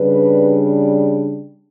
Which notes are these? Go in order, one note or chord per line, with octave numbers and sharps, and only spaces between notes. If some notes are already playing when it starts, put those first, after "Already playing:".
Already playing: C#3 G3 D4 B4